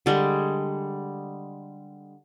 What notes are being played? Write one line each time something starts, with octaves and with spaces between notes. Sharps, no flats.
D3 G3 G#3